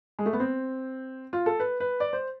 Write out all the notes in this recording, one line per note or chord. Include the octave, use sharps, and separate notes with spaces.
G#3
A3
B3
C4
F4
A4
B4
B4
D5
C5